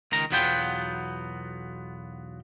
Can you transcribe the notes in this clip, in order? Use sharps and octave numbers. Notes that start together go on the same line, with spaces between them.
C#2 D#3 A#5
B1 E2 F#3 B3 F4 G5